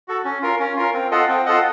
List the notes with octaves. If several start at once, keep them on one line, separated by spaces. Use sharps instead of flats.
F#4 A4
C#4
F4 A#4
C#4
F4 A#4
C4
F4 A4 D#5 F#5
C4
F4 A4 D#5 F#5